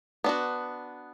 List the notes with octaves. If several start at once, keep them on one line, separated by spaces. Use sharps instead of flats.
B3 D4 F#4